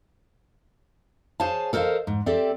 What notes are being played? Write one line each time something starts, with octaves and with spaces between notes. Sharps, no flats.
G#4 C5 C#5 F5 G#5 A5
A4 A#4 C5 D5 D#5 F5
G#2
C4 G4 A4 D5 E5